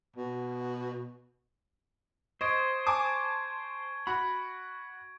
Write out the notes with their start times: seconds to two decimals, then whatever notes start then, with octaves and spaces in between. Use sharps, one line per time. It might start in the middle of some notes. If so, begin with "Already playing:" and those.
0.16 B2
2.41 C5 D#5 C#6 G#6 D7
2.87 G#5 A5 D6
4.07 F#4 B5